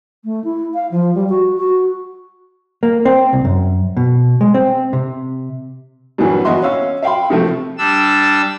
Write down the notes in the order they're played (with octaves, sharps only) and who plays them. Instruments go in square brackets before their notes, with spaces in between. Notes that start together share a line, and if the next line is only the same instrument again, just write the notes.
[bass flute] A3
E4
F5
F3
G3
F#4
F#4
[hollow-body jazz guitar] A#3
C4
C2
F#2
B2
G#3
C4
C3
[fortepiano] G2 A#2 E3 F#3 G3
E2 F#4 D#5 E5 C6
C#4 F5 E6
E5 F5 G5 B5 C6
C3 F3 A3 C4
[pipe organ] G3 D4 E6